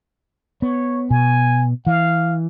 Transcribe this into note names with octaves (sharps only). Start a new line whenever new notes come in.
B3 C#5
B2 G#5
E3 F5